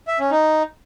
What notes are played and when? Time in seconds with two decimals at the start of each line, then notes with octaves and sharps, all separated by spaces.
0.07 E5
0.19 C#4
0.31 D#4